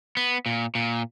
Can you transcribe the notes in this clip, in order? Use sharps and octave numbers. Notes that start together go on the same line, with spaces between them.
B3
A#2
A#2